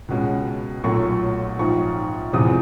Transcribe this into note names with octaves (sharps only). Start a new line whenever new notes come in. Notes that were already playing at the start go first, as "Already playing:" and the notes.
C#2 B2 G#3 C#4
B1 A#2 F#3 A3 C#6
A#1 G#2 F3 C#6
E2 C3 F3 G#3 D#6